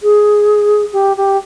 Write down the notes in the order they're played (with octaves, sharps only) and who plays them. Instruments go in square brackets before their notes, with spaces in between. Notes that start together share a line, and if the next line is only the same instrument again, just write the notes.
[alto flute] G#4
G4
G4